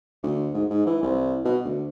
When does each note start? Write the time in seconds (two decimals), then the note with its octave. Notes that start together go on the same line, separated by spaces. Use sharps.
0.23 D2
0.54 G#2
0.70 G#2
0.86 E3
1.03 C2
1.44 B2
1.64 D2